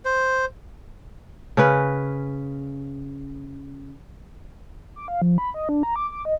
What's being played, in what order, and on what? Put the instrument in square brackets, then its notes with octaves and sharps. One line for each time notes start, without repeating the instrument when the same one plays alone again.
[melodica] C5
[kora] C#3 C#4 B4
[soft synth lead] D6
F5
F3
B5
D#5
D4
A#5
D6
D6
D#5